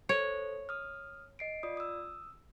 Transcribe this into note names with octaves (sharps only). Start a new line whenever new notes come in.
A4 C5 C#5
D#6 F6
D#5 C7 D7
F4 D5 D#6
D#6 E6